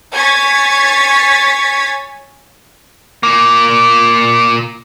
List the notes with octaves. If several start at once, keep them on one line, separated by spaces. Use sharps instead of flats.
C#5 G#5 C#6 G#6 A6 B6
A#2 A#3